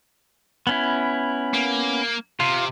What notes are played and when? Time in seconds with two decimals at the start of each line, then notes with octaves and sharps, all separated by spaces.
0.67 B3 C#4 E4
1.54 A#3
2.40 C3 F4